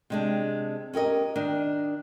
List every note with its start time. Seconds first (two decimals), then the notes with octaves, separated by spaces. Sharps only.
0.10 C3 G#3 D4
0.93 C#4 G4 A#4 D#5
1.36 D#3 D4